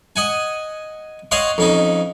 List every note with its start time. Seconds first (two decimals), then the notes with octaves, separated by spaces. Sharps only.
0.16 D#5 F#5 G#5
1.31 C#5 D#5 F5 F#5 C6
1.58 F2 C#4 D#4